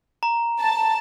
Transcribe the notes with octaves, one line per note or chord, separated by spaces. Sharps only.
A#5
A5